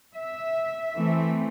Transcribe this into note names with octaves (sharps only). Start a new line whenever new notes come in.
E5
E3 A3 C4